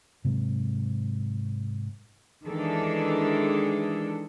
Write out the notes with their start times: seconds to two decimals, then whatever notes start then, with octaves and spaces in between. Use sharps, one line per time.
0.24 G#2 C3 F#3 G#3
2.47 D#3 E3 G#3 D4 G#4 A4